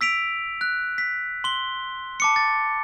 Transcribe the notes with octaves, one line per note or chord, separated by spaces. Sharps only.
E6 B6 D7 F7
F#6
B6
C6 G7
A5 D6 C#7
A6